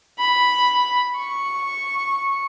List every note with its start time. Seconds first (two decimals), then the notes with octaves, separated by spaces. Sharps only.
0.19 B5
1.17 C#6